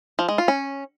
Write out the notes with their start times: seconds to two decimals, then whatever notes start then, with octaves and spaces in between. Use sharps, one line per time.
0.19 F3
0.29 G#3
0.38 F4
0.48 C#4